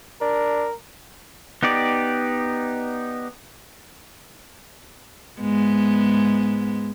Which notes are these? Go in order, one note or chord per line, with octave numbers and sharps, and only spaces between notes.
D4 A#4
B3 D#4 G4 D5
G#2 G#3 B3